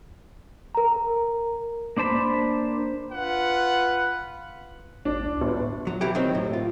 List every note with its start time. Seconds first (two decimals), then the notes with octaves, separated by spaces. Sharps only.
0.75 A#4 A#5
1.97 A#3 D4 C5 A5 B5
3.11 F4 B4 F#5
5.05 G#1 D4
5.25 C#2
5.41 G1 A2
5.87 F#3
6.01 B2 E3 E4 G4
6.15 D#3 F#3 C4
6.35 A2
6.53 F4